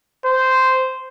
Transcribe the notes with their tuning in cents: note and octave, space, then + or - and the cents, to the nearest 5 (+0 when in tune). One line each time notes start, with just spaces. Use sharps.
C5 -10